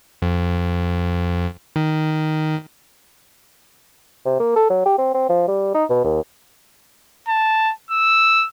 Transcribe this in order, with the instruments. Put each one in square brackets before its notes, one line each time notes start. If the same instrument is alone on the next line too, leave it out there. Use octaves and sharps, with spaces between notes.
[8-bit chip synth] F2
D#3
[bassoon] C3
A#3
A4
F#3
G4
C4
C4
F3
G3
D#4
B2
D#2
[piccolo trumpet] A5
E6